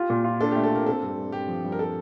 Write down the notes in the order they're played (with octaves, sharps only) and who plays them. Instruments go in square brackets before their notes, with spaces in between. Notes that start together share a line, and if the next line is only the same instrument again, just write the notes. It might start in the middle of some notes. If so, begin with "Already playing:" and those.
Already playing: [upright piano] F4 [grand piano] G4
[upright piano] A#2
F4
[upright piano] D4 [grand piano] A4
[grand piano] G4
[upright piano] A3
[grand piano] A4
[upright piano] F4 [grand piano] A#4
[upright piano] C4 [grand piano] A4
[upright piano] G2
G2
[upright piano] G2 [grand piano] G4
[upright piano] F3
G2
[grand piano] A#4
A4